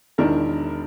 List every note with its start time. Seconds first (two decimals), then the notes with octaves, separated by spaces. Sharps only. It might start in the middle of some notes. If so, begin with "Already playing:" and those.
0.18 E1 D#3 D4 E4 A#4